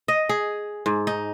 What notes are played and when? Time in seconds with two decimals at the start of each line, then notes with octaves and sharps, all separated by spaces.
0.08 D#5
0.29 G#4
0.86 G#2
1.07 D#4